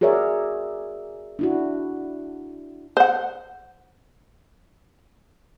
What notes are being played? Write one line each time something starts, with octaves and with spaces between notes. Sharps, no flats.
F#4 G#4 A#4 C#5 D5 E5
D4 E4 F#4
C5 F#5